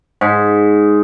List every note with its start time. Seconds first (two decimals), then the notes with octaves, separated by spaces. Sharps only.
0.21 G#2